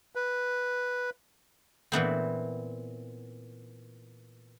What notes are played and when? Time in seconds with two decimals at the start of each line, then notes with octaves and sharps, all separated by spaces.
0.15 B4
1.92 A#2 E3 B3 C4